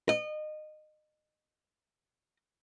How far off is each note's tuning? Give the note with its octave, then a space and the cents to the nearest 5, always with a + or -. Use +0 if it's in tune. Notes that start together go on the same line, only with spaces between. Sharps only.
D#5 -25